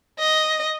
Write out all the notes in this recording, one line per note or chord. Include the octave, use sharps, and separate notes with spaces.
D#5